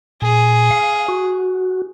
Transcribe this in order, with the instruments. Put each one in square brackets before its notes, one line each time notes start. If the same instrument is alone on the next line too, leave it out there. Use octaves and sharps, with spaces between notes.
[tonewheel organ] A#2 [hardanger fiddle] G#4
[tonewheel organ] F5
F#4